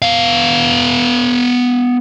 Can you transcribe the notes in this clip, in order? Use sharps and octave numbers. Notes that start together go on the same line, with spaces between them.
B3 F5